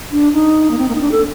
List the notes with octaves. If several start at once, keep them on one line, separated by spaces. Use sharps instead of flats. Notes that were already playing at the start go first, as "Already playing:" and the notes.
D4
D#4
A#3
C4
A#3
D#4
D4
A4